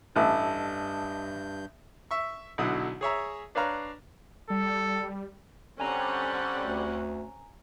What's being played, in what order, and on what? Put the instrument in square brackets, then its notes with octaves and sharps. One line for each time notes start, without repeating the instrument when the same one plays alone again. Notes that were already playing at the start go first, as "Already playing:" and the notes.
[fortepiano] A1 [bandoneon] G2 G6 [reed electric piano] D#5 A5 E6
[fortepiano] E5 C#6
B1 B2 D3 F#3 E4 D#6
G#4 C#5 E5 A#5
D4 B4 C#5 F5 A#5
[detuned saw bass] G3 [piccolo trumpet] A4
[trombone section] D3 G3 [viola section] C4 C#4 F#5 [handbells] G#5 A#5
[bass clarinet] D2